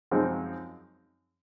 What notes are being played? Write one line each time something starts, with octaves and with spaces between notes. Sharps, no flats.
F#2 F3 G#3 C4 D#4